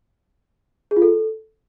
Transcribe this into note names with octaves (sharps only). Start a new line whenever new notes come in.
G#4
F4
A4